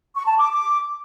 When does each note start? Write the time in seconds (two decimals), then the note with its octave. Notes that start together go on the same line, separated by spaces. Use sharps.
0.15 C#6
0.27 A5
0.39 D6
0.50 D6